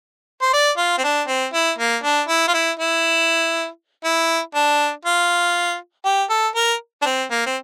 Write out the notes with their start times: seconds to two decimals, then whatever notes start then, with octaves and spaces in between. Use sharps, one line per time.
0.42 C5
0.53 D5
0.77 F4
0.98 C4
1.04 D4
1.28 C4
1.53 E4
1.78 A#3
2.03 D4
2.28 E4
2.48 F4
2.54 E4
2.79 E4
4.04 E4
4.55 D4
5.05 F4
6.05 G4
6.30 A4
6.55 A#4
7.02 D4
7.05 C4
7.31 A#3
7.46 C4